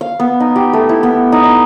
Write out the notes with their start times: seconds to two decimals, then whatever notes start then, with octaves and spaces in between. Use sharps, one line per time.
0.01 F5
0.19 B3
0.40 D#4
0.56 G4
0.73 A3
0.89 E4
1.03 B3
1.32 D#4
1.44 D#4